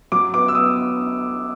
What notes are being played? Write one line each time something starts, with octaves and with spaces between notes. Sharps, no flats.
F#3 D6
B3 D6
E6
B3 D#6